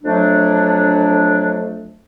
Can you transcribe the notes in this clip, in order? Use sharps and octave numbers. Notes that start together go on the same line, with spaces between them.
F2 F#3 A3 D4